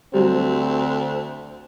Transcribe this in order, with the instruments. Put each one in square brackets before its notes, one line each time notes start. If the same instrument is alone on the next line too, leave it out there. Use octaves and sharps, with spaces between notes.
[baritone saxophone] D2 [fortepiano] F#3 G3 [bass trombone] C4